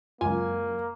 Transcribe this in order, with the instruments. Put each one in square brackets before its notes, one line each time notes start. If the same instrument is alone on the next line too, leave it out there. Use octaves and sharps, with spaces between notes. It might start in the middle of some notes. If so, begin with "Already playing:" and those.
[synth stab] C#2 F4 [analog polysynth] F#2 [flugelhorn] A#3 [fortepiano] G#5